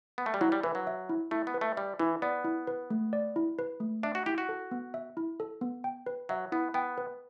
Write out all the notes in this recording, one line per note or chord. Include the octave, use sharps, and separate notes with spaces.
B3
A3
G3
F#3 E4
G3
E3 B4
F#3
E5
E4
A3 E4
B3
B4
A3
G3 E5
E3 E4
B3 D5
E4
B4
A3
D5
E4
B4
A3
D4 E5
F#4
E4 G4
F#4
A4
B3
E5
E4
A4
B3
G5
B4
F#3 E5
B3 E4
B3 G5
B4